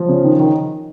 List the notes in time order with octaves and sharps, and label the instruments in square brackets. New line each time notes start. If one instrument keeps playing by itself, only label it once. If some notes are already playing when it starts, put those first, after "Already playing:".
Already playing: [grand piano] F3
C#3
D#3
D#3